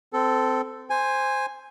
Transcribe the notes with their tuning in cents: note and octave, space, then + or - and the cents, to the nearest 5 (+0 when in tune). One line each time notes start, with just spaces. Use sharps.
C4 -20 A4 +0
C5 +0 G#5 -10